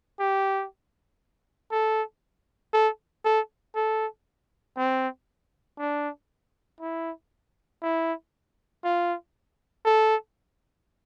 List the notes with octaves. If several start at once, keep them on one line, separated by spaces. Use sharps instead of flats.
G4
A4
A4
A4
A4
C4
D4
E4
E4
F4
A4